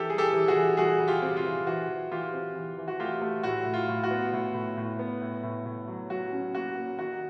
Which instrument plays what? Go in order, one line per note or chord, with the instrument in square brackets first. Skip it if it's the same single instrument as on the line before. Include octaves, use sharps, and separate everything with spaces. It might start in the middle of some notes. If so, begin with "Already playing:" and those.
Already playing: [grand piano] E3 G4 A4
G3 G#4
G4 A4
E3
F#4 G#4
E3
G3 F#4 G#4
G3
F4 G4
C4
F4
E3
E3 F#4
E3
E3 F4 G4
C4
E3
E3
F#4
A3 F4 G4
A3
A2 F#4
A2
F4
A2
F#4
B3
A2
A2
A2
B3
A2
A2
A2
F#3
F#3 F#4
C#4
A#3 F#4
A#3
D#3 F#4